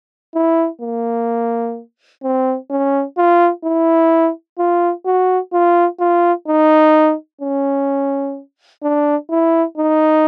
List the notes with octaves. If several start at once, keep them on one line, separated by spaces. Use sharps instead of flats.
E4
A#3
C4
C#4
F4
E4
F4
F#4
F4
F4
D#4
C#4
D4
E4
D#4